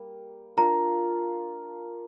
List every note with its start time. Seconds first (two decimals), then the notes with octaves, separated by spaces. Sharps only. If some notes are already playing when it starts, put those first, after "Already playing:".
Already playing: G3 A#3
0.57 D4 F4 A#4 F5 A#5